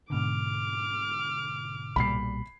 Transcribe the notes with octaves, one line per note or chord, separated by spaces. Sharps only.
G#2 B2 D3 D6 F6
B1 A#2 G3 B5 C7